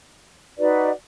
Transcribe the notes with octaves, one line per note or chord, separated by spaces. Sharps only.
D#4 F#4 B4 D5